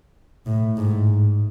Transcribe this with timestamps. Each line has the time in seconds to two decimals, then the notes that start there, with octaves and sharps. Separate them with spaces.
0.46 A2
0.77 G#2